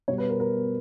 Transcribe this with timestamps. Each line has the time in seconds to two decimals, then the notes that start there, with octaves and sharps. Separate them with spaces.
0.08 B2 G3 C#5
0.18 B4
0.30 A#4
0.40 A#4